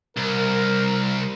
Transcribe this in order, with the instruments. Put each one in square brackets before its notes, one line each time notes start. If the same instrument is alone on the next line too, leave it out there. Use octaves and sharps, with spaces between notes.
[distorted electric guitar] C2 [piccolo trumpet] A#4